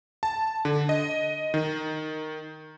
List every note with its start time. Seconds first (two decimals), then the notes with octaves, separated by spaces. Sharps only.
0.23 A5
0.65 D3
0.89 D#5
1.54 D#3